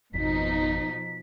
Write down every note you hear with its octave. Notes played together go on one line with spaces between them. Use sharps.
G#1 F2 B2 F3 D#4 B6